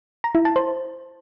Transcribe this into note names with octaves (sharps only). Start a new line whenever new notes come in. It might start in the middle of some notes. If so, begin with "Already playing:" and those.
A#5
E4
A5
C5